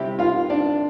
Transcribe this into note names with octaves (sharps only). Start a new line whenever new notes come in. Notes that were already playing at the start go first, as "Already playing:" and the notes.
Already playing: C3 G3 C4 E4 G4 G5
F4 F5
D4 D5